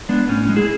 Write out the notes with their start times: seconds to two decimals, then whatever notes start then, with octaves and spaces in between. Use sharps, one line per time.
0.09 G#3 B3 D4
0.29 A2 C#4
0.43 C#4
0.49 G#3
0.56 E4 G#4